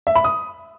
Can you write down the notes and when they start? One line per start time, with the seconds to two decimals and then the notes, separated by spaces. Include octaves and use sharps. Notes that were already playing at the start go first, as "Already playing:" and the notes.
0.07 E5
0.16 B5
0.24 D#6